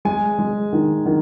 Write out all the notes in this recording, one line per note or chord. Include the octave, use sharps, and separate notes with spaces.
G#3 G#5
G#3
D#3
D#3